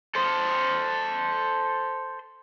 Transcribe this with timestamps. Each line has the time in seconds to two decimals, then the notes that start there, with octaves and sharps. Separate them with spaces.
0.15 A4 C5